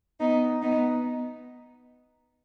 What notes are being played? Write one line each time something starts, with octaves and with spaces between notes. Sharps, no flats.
B3 D#4
B3 D#4